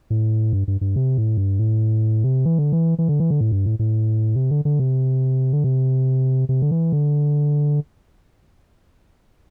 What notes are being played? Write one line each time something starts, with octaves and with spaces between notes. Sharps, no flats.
A2
G2
G2
G2
C3
A2
G2
A2
C3
E3
D3
E3
E3
D3
E3
D3
A2
G2
A2
A2
C3
D3
D3
C3
D3
C3
C3
D3
E3
D3